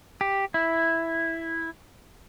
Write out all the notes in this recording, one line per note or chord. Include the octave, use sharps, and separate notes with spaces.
G4
E4